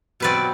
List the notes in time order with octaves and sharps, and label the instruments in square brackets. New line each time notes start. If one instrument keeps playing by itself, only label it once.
[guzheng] B2 F#3 C4 B4 D5